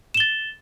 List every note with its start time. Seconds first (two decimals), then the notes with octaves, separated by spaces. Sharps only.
0.14 E7
0.17 G7
0.20 A6